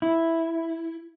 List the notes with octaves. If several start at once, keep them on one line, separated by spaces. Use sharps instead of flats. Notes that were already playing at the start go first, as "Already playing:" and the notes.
E4